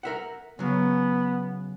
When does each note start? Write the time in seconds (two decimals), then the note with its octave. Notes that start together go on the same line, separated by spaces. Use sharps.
0.03 A#4 E5 F#5
0.59 C#3 F#3 B3